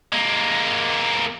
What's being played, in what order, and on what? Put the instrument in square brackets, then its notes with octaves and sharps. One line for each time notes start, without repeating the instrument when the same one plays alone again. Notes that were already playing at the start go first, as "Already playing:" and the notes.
[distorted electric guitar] G#3 A#3